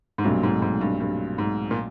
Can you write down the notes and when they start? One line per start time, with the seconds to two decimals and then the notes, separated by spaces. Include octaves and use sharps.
0.18 G#2
0.24 B1 G2 A#2 F#3 A3 C4
0.43 G#2
0.62 G#2
0.81 G2
1.00 G2
1.38 G#2
1.71 A#2